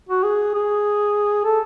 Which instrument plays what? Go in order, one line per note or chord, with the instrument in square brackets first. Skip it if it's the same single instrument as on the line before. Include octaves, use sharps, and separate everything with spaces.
[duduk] F#4
G#4
G#4
A4